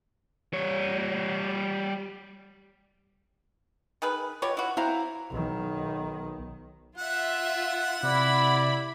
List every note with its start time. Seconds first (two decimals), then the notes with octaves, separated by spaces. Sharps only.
0.53 G3 C#5
4.02 D#3 G#4 B4
4.42 B2 F4 G4 B4 C#5 D6
4.57 E4 F#4
4.77 C4 E4 F#4 C5 F5 A#5
5.30 B1 D#3
6.98 F4 E5 F#5
8.03 C3 E4 D5 B5